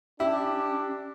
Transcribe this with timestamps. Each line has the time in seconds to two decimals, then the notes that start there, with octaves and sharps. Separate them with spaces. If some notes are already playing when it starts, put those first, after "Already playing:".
0.20 C#4 D4 E4 G4